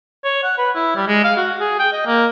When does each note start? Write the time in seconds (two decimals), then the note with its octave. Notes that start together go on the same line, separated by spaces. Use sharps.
0.24 C#5
0.44 F#5
0.58 B4
0.75 E4
0.95 G3
1.08 G#3
1.24 F5
1.37 F#4
1.60 G#4
1.79 G5
1.92 D#5
2.06 A#3